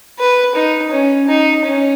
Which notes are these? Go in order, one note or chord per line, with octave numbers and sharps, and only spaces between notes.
B4
D#4
C#4
D#4
C#4